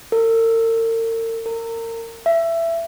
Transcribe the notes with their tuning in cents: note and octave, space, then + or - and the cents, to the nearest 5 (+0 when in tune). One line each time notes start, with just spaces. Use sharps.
A#4 -45
A#4 -30
E5 +15